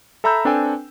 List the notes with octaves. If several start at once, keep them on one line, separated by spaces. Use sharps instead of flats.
A4 E5 A#5 B5 E6 G6
C4 D4 A4 B4 G5 G#5